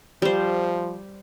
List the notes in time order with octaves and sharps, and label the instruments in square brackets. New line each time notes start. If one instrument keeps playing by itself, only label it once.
[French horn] F3 [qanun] G3 C5